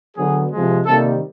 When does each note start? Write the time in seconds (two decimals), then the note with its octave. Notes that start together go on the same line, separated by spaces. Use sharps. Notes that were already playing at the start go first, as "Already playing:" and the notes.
0.16 D3 F#3 B3 G#4
0.51 C3 F3 G#3
0.85 C3 D#3 G3 A#3 A4